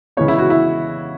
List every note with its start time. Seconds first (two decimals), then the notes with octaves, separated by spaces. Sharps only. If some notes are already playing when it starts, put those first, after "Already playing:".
0.17 C#3 E3 G#3 B3 C#5
0.28 E4
0.39 F#4
0.50 E4